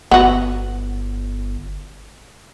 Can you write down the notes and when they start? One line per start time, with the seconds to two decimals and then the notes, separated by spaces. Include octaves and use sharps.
0.11 G1 B3 F#4